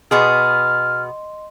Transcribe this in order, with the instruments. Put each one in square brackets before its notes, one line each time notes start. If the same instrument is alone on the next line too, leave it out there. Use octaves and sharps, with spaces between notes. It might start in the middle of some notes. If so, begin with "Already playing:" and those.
[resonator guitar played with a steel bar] B2 B3 G#4 [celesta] D#5 C6 [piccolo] F6